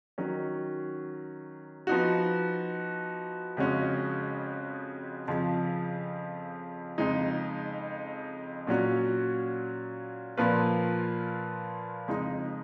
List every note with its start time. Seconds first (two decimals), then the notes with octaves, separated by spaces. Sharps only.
0.18 D#3 F#3 C#4
1.87 F3 B3 D#4 F#4
3.57 F2 C#3 G#3 C#4 F#4
5.28 F2 C#3 F3
6.98 F2 C#3 G#3 D#4
8.67 A#2 F#3 C#4 F#4
10.37 A#2 F3 A#3 F4 B4
12.08 F2 C#3 G#3 D#4